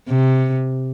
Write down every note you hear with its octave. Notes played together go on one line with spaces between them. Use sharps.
C3